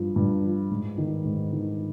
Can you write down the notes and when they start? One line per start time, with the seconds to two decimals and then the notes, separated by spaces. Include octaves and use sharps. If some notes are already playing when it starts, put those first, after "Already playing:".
Already playing: G2 F3
0.16 G2
0.43 F3
0.71 G#2
0.98 D#3
1.25 G#2
1.53 D#3